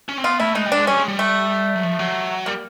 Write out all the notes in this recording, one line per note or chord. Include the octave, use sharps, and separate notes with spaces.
C#4
C4
B3 F4
A3 E4
G#3 D#4
G3
D4
G#3
G3 C#4
G#3
G3
A3
F#3
F3
F#3
G3 A#3